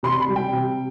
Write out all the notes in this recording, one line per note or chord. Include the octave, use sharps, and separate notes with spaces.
C3 C6
B5
G3
G5
C3